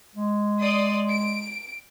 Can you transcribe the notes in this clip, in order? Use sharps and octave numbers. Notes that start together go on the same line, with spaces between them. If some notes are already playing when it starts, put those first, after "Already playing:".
G#3
D5 C6 D#6
D7